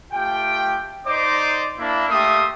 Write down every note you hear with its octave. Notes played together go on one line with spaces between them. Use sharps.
A3 F4 G4 G5
D#4 C5 D5 D#5 C6 D6
A#3 D4 E4
A3 A#3 G4 E5 C6 D#6